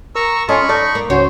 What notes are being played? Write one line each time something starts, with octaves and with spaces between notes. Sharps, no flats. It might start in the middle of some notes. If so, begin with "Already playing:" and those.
A#4 A#5 C#6 E6
C#4 F4 A4 D#5 G#5 B5 C#6
D#4 A4 D5
A#3
C#2 C#4 F#4 C5 C#5